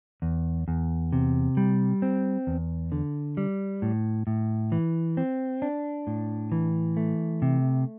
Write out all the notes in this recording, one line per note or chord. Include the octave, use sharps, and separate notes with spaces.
E2
E2
C3
G3
C4
E2
D3
G3
A2
A2
E3
C4
D4
A2
E3
A3
C3